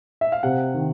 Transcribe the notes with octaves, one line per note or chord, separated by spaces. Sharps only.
E5
F5
C3 F#5
D#3